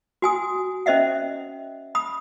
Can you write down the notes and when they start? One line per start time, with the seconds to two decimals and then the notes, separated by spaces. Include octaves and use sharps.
0.22 F#4 G#5 D#6
0.86 C#4 C5 D#5 E5 F#5
1.95 B5 D#6